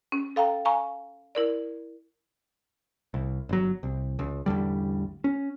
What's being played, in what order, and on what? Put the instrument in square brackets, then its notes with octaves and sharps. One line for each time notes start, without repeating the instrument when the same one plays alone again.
[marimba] C#4
A4 F5 G5 A#5
F5 G#5 A#5 C#6
E4 A#4 D5
[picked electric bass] C2
G1 F#3
C2
C#2
A1 E2 D3 G3
C#4